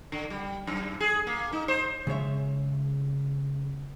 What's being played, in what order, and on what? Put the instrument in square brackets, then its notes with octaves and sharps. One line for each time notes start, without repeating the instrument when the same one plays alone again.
[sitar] D3
G3
F#2
G#4
A#3
D#4
C5
[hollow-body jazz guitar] C#3 G#3 C#5 E5